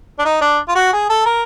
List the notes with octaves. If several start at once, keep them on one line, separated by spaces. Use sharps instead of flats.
D4
D#4
D4
F4
F#4
G#4
A4
A#4